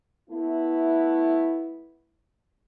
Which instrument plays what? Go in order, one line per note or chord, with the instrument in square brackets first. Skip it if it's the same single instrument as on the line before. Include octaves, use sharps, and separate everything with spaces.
[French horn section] A3 B3 E4